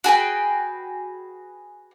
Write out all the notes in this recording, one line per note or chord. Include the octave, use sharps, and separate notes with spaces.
F#4 G#4 B4 G5